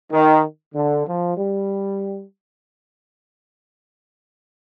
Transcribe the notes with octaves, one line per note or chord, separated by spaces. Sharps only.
D#3
D3
F3
G3